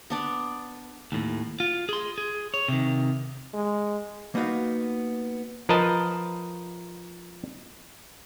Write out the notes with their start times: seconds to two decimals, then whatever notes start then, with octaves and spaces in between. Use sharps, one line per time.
0.10 B3 D4 D5
1.12 D#2 A2
1.60 F4
1.89 G#4 C6
2.18 G#4
2.54 C#5
2.68 C3 D#3
3.54 G#3
4.35 A#3 B3 D#4 F#4 F5
5.69 F3 A#4 B4 D#5 A5